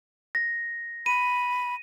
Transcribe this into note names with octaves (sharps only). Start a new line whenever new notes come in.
A#6
B5 D#7